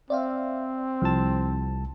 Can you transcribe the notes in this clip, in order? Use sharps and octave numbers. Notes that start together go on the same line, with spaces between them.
C4 D5 E5 F5
C2 F3 A5